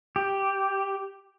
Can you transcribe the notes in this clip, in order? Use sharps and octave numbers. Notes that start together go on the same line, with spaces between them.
G4